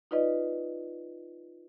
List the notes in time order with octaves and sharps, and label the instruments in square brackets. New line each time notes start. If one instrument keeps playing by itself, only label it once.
[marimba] D#4 F4 B4 D5 D#5